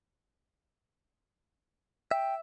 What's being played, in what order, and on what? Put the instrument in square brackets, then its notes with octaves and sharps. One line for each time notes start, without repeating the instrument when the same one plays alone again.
[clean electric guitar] E5 [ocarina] G5